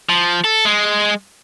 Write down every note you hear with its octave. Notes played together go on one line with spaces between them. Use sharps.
F3
A4
G#3